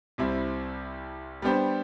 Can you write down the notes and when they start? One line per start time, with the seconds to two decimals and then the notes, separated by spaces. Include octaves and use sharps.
0.18 C2 C3 G3 C4 E4
1.42 G3 B3 D4 G4 C5